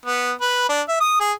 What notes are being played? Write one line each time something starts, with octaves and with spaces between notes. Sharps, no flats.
B3
B4
D4
E5
D#6
G#4